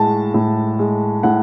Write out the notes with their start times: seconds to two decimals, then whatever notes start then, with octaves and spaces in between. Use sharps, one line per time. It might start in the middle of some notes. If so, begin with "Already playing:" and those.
Already playing: A2 G#3 A5
0.34 A2
0.79 G#3
1.23 A2 F#5